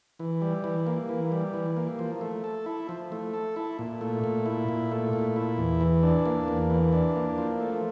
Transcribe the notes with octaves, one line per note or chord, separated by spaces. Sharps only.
E3
G3
E3
A#3
E3
G3
E3
A#3
F3
A3
A4
E4
F3
A3
A4
E4
A#2
A3
A#2
E4
A#2
A3
A#2
E4
E2
E3
D4
A#3
E2
E3
D4
A#3
F3
A3